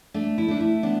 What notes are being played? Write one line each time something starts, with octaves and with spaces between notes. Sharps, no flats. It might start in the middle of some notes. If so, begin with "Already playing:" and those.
A3 D4
E4
A3 D4
E4
B3 D4